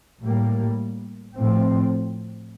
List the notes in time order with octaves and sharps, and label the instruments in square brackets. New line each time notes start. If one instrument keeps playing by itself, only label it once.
[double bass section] A2 G3 A#3
A2 F3 C4